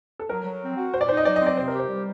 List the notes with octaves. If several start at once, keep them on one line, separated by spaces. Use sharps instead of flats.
A4
F#3 A#4
F#3
C4
F#4
A#2 C5
D5
D#4 C5
D#5
F#3 D5
D#5
C4
D5
C3 C5
A#4
G4
C5
G3